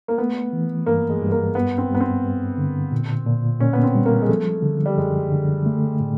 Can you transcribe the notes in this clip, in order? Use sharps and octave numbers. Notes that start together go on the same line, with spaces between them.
A#3
A3 B3
E3
G2 A#3
G#3
G2
A#3
G2 B3
C4
G2 B3
C4
G2
D3
A#2
A#2
A#2 C#4
B3
C4
G3
A#3
G#3
F3 A3
D3
G3
F#2 G#3
D3
A3
A2